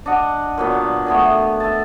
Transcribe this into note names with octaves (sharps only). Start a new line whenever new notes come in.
D4 D#5 F#5
A#2 F#3 B3
A3 B3 G#4
E5 A5